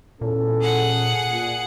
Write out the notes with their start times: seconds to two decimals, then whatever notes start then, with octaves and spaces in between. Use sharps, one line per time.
0.21 E2 A#2 C#4 A4
0.61 G#4 F#5
1.32 A#2